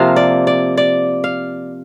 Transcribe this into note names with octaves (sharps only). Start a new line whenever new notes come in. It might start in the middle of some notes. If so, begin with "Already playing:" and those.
Already playing: C3 F3 A#3 F5
D5
D5
D5
F5